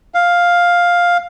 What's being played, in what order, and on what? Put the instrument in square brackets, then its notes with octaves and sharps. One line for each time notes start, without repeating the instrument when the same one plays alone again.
[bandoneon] F5